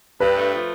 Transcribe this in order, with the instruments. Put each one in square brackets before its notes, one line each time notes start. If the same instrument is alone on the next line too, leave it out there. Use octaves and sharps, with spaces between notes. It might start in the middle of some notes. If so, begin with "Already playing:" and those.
[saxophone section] G2 [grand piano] B4
[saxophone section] A3
F3